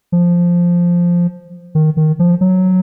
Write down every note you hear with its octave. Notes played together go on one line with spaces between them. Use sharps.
F3
D#3
D#3
F3
F#3